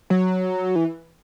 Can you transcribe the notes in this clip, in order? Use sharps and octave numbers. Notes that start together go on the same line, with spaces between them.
F#3
E3